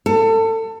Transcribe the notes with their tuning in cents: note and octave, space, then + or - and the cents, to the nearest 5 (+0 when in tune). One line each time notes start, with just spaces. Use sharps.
A4 +25